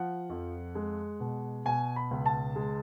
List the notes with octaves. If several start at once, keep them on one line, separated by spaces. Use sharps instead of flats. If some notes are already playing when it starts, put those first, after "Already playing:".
Already playing: F3 F#5
F2
G#3
B2
B2 G#5
B5
C#2
A5
G#3